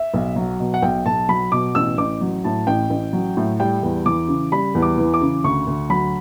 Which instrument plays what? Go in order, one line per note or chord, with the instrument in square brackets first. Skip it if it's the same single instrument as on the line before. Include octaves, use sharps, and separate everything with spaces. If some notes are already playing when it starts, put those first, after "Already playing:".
Already playing: [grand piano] E5
B1
F#3
B2
F#5
B1 G5
B1 A5
F#3 B5
B2 D6
A1 E6
A1 D6
F#3
A2 A5
A1 G5
A1
F#3
A2
G3 G5
E2
E3 D6
C#3
G3 B5
E2
D6
E3
D6
C#3
D2 C#6
D2
F#3 B5